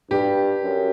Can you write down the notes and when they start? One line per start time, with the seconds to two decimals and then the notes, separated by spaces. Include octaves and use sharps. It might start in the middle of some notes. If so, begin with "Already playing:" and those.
0.11 G2 G4
0.63 F#2